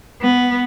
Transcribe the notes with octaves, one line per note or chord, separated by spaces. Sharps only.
B3